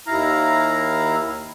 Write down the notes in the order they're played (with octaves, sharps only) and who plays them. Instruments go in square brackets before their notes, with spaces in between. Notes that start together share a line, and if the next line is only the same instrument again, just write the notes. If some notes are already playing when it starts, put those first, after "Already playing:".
[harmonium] D#2 E4 F5 A#5